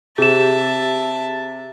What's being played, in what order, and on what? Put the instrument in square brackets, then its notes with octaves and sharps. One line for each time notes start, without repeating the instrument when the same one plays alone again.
[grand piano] C3 [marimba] G4 [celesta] G#4 E7 [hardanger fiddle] E5 A5